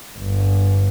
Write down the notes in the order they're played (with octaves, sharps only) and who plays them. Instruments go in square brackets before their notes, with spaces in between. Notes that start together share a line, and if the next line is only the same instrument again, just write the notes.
[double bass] G1